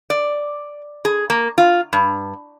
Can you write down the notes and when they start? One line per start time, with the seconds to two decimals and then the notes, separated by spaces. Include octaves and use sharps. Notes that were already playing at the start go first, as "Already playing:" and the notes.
0.10 D5
1.05 G#4
1.30 A#3
1.58 F4
1.93 G2